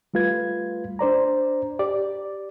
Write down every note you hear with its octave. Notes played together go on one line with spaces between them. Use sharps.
G3 A3 F4 B4 G#6
D4 C5 D5 A#5
G4 D5